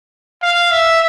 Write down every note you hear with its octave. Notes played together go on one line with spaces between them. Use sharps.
F5
E5